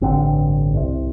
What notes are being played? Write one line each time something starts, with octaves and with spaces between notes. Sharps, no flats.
A1 G2 D3 C4
C2 C3